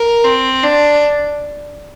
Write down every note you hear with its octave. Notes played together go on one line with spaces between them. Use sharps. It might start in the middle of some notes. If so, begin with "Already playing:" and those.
Already playing: A#4
C4
D4